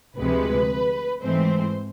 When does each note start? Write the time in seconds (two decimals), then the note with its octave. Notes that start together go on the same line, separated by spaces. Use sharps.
0.17 D2 C3 F3 G#3 B4
1.23 G#2 E3 A3 C4 C5